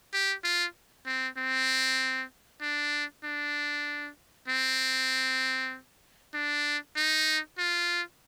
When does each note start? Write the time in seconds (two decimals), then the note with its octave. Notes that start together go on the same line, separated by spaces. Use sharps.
0.13 G4
0.44 F4
1.06 C4
1.37 C4
2.62 D4
3.24 D4
4.48 C4
6.34 D4
6.96 D#4
7.58 F4